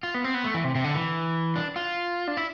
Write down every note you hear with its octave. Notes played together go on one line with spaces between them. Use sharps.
F4
B3
C4
B3
A3
E3
C3
C3
D3
E3
D4
F4
D4
E4